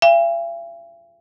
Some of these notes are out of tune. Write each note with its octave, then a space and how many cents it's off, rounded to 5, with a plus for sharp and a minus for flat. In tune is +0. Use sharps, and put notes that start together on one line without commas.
E5 +45 G#5 -45